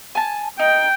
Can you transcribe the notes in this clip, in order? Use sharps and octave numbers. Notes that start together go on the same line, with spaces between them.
G#5 A5
D#4 G5